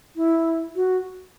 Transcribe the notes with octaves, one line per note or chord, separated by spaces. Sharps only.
E4
F#4